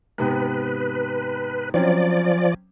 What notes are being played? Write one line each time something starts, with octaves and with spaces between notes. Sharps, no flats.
G#2 C3 B3 B4
F3 F#3 C4 C#4 D5